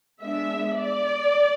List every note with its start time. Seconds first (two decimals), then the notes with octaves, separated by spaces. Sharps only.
0.22 G#3 B3 D4 E5
0.78 D5